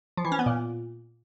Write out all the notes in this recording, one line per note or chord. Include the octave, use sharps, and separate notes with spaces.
F3
E3
C#4
B3
A#2